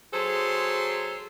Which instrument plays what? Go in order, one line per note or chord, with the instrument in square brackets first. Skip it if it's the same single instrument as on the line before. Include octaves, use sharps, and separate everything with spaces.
[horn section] F#3 G#4 A4 C5 C6